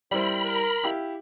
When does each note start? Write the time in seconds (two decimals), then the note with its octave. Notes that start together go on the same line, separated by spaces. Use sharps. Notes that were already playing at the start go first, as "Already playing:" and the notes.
0.11 G3 C4 E4 A#4 C5 B5
0.44 A#4
0.84 E4 G4 F5